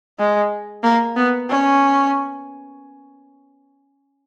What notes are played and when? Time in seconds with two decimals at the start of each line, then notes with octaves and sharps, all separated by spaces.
0.19 G#3
0.83 A#3
1.16 B3
1.49 C#4